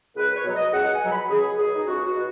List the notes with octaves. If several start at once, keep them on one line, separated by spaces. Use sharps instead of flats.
C#2 B4
C#5
B2 F#3
D#5
C#2 F#5
G#5
B2 F#3
B5
C#2 G#4
B2 F#3 G#4
D#4
C#2 F#4
F#4
B2